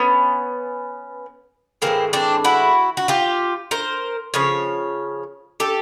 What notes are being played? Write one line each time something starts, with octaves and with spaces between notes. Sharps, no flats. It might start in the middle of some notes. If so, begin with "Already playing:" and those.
Already playing: B3 C#4
A2 E3 G#3 A#3 C4
C4 D4
E4 F#4
F#4
F4 G4
A#4 C5
C#3 F3 C#5
G4 A4